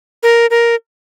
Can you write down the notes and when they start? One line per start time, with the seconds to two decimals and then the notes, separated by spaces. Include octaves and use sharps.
0.23 A#4
0.50 A#4